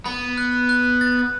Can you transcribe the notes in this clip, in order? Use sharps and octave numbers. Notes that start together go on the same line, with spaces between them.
B3 B5
F#6
F#6
A6